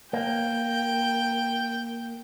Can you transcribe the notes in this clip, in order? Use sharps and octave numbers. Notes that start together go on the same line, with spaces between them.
A#3 G5